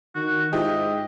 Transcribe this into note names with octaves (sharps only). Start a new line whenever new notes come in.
D#3 F#4
G#2 E4 F4 G4 D#5